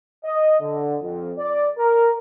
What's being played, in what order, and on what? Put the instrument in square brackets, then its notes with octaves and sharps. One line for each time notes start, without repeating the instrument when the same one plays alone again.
[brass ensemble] D#5
D3
F2
D5
A#4